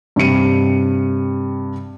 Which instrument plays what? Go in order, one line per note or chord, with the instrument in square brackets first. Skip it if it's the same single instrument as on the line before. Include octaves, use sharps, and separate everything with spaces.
[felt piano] G2 C3 G3 C#7 D#7